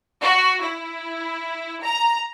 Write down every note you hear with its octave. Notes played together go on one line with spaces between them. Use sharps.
F#4
E4
A#5